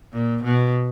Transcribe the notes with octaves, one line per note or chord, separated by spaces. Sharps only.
A#2
B2